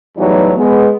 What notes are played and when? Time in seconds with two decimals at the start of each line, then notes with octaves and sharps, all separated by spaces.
0.17 E2 A2 E3 F#3 G3 D#4
0.56 G#3 B3